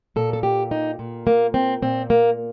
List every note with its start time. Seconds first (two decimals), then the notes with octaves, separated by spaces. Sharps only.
0.16 A#2 A4
0.33 A4
0.43 G4
0.71 D#4
0.99 A#2
1.27 A#3
1.54 C4
1.82 A#2 C4
2.10 A#3